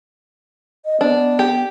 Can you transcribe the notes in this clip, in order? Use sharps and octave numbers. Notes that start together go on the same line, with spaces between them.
D#5
B3 D4
G4